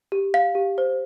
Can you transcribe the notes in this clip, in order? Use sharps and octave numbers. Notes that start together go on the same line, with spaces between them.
G4
F5
G4
C5